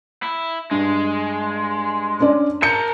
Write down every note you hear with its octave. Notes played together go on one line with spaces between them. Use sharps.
E4
G2 G#3
C#4 D4 D5
A#4 A5 G6 C#7